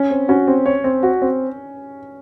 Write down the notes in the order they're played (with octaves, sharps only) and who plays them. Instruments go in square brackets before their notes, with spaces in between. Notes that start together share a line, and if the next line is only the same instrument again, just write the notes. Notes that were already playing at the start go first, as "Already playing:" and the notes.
Already playing: [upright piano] C#4
[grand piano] C4
[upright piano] C#4 [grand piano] F#4
[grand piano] C4
C#5
C4
F#4
C4